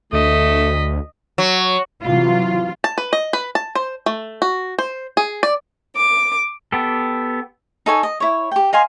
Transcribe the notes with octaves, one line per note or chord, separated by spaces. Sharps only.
D2 A3 D#5 B6
F#3
C3 E3 F#3 F4
A5
B4
D#5
B4
A5
C5
A3
F#4
C5
G#4
D5
D6
B3 G4 A4
D#4 A4 C#5 G#5
D#5
E4 C#5
G4 G5
D#5 F5 G#5 C6